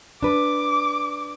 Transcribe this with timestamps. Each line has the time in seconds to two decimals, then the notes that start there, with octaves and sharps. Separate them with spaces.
0.23 D4 B4 D6